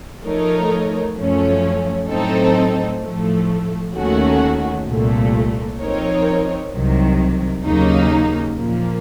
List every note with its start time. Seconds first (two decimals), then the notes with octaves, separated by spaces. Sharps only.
0.25 F3 A3 D#4 A#4 C#5
1.17 F#2 F3 A3 C#4
2.09 A2 F#3 C4 D#4 A4
3.02 A2 F3 A3
3.94 D#2 D#3 A3 C#4 F#4
4.86 C2 A#2 A3
5.79 F3 C4 D#4 A#4 C#5
6.72 C2 C3 D#3 F#3
7.64 D#2 C#3 F#3 A#3 D#4
8.56 A#2 F3 A#3